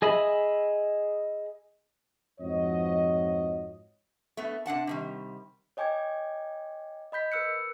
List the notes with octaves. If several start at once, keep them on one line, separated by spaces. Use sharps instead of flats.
G#4 D#5 E5 B5
F2 G#2 F3 F#4 C#5 D#5
A3 B3
C3 D4 F#5 A5
C3 D#3 G3
C#5 D#5 G5 G#5 D6 G#6
D#5 B5 G6 B6
A#4 B4 E6 F#6 C#7